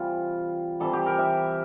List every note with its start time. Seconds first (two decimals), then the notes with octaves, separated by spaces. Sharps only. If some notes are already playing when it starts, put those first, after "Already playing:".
Already playing: C3 E3 G3 F4
0.80 C3 E3 G3 A4
0.93 G4
1.06 A#4
1.19 E5